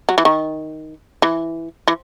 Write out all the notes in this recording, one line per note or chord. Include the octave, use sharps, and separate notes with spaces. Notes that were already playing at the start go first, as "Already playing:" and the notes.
F#3
E3
D#3
E3
E3